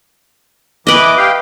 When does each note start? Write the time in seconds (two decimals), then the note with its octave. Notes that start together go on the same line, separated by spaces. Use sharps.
0.87 E3 B4 D#5 D6
1.17 G4 F5 G5